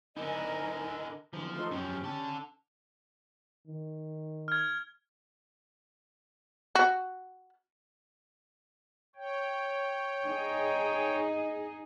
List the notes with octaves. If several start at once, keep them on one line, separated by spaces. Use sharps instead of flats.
D3 D#4 E4 A#4 D#5 G#5
F2 D3 E3 F3
A3 D#4 F4 A4 C5 C6
F#2 F3 C#4 G4
D3 C#4 A5
D#3
F6 G#6
F#4
C#5 G5
D#4 G#4